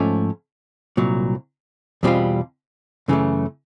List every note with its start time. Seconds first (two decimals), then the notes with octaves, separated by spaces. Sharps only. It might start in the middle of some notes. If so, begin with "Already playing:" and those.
Already playing: G#2 F3 A3 C#4
0.97 C2 A#2 F#3
2.03 E2 B2 G3 C4 F4
3.08 F#2 C#3 E3 A3